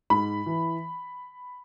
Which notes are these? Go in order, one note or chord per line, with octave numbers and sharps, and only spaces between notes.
G#2 B5
E3